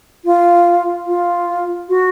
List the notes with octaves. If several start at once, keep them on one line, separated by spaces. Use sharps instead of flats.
F4
F4
F#4